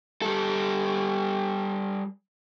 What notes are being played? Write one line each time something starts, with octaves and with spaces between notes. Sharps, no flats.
G3 A4